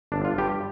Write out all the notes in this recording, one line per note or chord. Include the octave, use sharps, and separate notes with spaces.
G1 D4
F4
G2 G3 G4